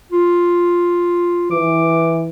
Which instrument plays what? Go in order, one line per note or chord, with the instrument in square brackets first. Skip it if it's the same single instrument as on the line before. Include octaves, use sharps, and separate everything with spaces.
[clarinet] F4
[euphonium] E3 [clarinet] D6